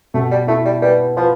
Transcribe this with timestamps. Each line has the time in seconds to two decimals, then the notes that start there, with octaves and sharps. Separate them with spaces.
0.14 B2 A3
0.31 G3
0.47 A3 E4
0.65 G3
0.82 G3 B4
1.17 F3 B4